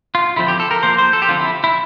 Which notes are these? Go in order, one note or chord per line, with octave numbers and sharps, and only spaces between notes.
F4
D3 F3 C4 E4
G4
A4
A#4
F3 A#3 C5
C5
A4
G4
D3 F3 C4 F4
E4
E4